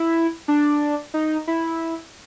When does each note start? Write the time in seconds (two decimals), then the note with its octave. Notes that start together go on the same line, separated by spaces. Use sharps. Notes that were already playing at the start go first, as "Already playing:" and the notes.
Already playing: E4
0.48 D4
1.14 D#4
1.47 E4